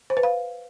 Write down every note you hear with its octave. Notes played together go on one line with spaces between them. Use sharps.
C5
B4
F5